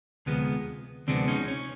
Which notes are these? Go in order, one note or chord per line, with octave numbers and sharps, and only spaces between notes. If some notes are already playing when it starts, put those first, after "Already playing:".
D2 C3 F3 G#3 B3
D2 C3 F3 G#3 B3 C4 D4
C#4 D#4
C#4